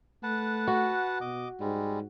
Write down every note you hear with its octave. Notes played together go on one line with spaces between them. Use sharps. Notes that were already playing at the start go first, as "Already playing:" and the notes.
A3 B4 F#5 A5
F#4
B2 D#5 D6
G#2 G3 G#3